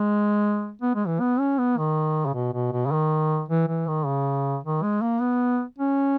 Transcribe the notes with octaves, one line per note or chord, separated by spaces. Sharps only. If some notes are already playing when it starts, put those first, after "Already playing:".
Already playing: G#3
B3
G#3
E3
B3
C#4
B3
D#3
C#3
B2
B2
B2
C#3
D#3
E3
E3
D#3
C#3
D#3
G#3
A#3
B3
C#4